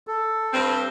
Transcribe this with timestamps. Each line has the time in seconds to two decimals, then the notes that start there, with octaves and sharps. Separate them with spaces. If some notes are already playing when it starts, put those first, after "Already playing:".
0.07 A4
0.53 G2 C4